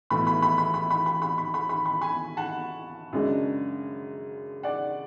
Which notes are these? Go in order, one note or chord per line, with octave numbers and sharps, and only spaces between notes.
B1 A2 E3 A3 B5
B5
B5
B5
B5
B5
B5
B5
B5
B5
B5
B5
G#5 B5
F#5 A5
F#2 C#3 G#3 D4
D5 F#5